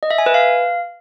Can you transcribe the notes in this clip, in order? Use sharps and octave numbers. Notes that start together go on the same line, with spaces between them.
D#5
E5
G#5
B4
F5